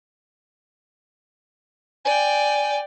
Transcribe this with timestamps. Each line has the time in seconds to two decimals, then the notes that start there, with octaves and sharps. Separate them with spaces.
2.05 D5 G5 G#5